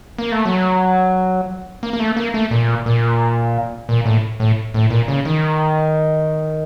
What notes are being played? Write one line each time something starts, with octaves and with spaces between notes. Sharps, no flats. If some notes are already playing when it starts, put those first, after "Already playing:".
A#3
A3
F#3
A#3
A#3
A3
A#3
A3
A#2
A#2
A#2
A2
A2
A2
A#2
C#3
D#3